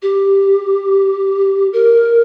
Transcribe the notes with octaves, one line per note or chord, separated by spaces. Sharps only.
G4
A#4